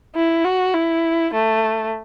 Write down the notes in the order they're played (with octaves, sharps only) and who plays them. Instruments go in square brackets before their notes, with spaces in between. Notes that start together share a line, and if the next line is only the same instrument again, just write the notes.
[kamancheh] E4
F#4
E4
A3